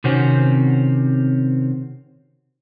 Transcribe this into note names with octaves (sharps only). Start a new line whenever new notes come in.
C3 D#3 C4 C#4 F#4